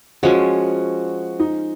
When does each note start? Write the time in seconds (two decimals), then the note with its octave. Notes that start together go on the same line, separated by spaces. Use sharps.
0.23 F3 G#3 C#4 F#4
1.39 D#4